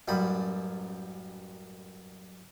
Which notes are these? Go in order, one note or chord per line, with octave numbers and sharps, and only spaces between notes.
A1 F#2 G3 B5